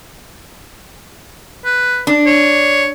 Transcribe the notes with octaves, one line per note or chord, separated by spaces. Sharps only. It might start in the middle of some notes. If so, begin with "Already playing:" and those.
B4
D4
C#5